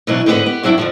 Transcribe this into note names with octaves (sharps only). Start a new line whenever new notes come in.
B2 E3 F#3 C#4 D4
G#2 D3 B3 F#4 B4 D#5
B3 G4
G2 F#3 D4 E4 G5
F2 D3 F3